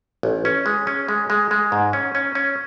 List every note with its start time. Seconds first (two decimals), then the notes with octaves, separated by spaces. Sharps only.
0.23 A1
0.45 C#4
0.66 G#3
0.87 C#4
1.08 G#3
1.30 G#3
1.51 G#3
1.72 G#2
1.93 C#4
2.15 C#4
2.35 C#4